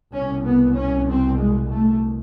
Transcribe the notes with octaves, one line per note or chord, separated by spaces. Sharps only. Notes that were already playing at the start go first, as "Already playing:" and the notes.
C2 B2 C#4
B3
C#4
C4
G#3
A3